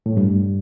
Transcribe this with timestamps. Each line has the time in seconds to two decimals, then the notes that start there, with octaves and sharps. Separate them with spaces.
0.06 A2
0.17 G2